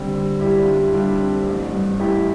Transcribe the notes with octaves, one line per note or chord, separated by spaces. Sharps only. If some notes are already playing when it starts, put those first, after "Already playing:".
Already playing: D3 G3 C4
G3
G3 E4 G4
D4 F4
G3
E4
G3 D4 F4
C4
A1
G2
A1 E4 G4